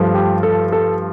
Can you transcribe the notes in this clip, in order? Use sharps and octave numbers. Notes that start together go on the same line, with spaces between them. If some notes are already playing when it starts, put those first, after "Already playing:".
Already playing: G2 F3 A3
G4
A4
A4